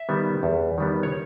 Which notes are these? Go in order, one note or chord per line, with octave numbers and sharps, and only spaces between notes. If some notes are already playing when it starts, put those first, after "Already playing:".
Already playing: E5
D#3 G3 B3
E2
D#3 G3 B3
C#5